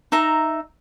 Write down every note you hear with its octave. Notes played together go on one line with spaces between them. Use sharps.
D#4 E5 A#5